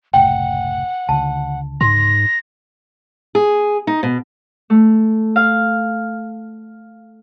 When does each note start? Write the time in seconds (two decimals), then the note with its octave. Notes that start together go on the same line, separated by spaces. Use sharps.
0.14 F#1 C2 A2 F#5 G5
1.09 C#2 D3 A5
1.81 G#2 C6 A#6
3.35 G#4
3.87 D#4
4.03 B2
4.70 A3
5.36 F5